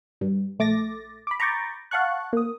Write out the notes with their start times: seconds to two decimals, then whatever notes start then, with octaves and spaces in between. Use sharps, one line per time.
0.21 G2
0.59 A#1 A3 D6 A6 A#6
1.27 B5 D6
1.40 A#5 B5 C#6 D6 G6 A6
1.91 F5 F#5 A5 C#6 F#6
2.33 A#3 D#6